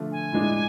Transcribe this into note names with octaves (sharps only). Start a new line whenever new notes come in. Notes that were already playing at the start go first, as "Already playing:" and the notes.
Already playing: D3 F3 A3 F4
G#5
A2 G#3 D4